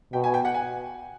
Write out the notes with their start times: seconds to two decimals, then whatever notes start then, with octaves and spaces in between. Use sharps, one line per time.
0.13 B2 G5
0.24 G#5
0.34 G5
0.45 F#5
0.54 G#5